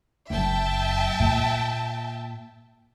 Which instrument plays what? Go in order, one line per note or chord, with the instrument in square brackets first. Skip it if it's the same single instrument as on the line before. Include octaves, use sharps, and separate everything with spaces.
[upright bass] F#1 F#2 [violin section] E5 G5 A5
[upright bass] A#2